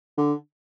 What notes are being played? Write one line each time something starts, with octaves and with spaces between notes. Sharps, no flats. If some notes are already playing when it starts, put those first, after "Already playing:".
D3